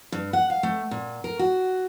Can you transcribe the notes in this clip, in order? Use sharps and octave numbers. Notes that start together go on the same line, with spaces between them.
G2
F#5
F5
A3
A#2
A#4
F#4